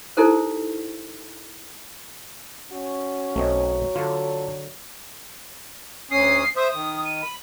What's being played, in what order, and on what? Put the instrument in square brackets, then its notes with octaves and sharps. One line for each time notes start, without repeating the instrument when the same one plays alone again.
[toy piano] D#4 E4 G4 A4 A#4 C5
[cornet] C#4 [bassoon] F#4
[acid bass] B1 [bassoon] F#3 [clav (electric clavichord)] A3 C4 D#5
[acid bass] D3 [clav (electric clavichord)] F4 C#5 [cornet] A4
[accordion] D2 C#4 D#6 [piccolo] C7
[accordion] C5 E5 [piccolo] D#6
[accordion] D#3
[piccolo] D#7
[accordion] B5